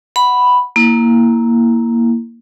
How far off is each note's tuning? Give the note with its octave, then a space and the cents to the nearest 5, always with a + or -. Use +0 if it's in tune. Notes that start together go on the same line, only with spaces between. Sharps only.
F#5 +0 B5 +0
A#3 +0 E4 +0